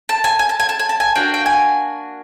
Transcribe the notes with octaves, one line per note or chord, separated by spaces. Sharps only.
A5
G#5
G#5
A5
G#5
A5
G#5
A5
G#5
A#3 D4 F#4 G5
G5
G#5